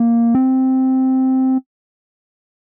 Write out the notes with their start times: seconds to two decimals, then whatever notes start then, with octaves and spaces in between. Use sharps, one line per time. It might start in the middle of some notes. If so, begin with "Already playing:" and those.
Already playing: A#3
0.35 C4